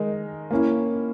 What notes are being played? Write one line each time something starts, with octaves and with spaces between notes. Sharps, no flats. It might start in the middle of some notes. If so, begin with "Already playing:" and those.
Already playing: D#3 G#3 D#4 A#4
A#3 C#4 E4